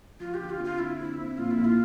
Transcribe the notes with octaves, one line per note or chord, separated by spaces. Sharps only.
F3 F4
G4
D3
F4
C4
F4
D3 E4
C4
C4
A#1 F4
E4
A#1
F4